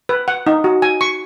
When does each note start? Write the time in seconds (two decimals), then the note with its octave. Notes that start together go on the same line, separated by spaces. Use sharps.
0.09 B4
0.28 F#5
0.47 D#4
0.64 F#4
0.82 G#5
1.01 C#6